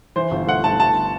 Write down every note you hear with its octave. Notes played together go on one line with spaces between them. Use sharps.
E3 C5
G1
A3 F#5
A3 A5
G1 A5